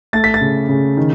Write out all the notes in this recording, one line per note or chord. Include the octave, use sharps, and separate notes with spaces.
A3 A6
B6
A6
C#3
C#3
D#3